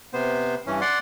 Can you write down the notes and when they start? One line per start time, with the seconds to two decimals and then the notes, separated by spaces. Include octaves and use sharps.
0.13 C3 B3 C5
0.66 G2 E3 C#4
0.81 D5 F#5 C6